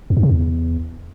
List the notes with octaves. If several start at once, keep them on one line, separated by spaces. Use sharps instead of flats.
E2
G2
C3
E2